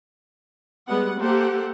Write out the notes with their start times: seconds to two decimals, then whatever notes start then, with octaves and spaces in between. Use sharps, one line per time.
0.88 G3 G#3 B3 F#5
1.20 A#3 G4 A4 C5 F#5